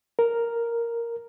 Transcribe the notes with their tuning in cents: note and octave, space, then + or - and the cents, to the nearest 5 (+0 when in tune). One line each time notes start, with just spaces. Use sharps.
A#4 +0